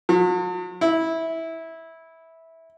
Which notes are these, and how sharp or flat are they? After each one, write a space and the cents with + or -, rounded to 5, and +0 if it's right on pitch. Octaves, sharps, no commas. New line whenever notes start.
F#3 -45
E4 -15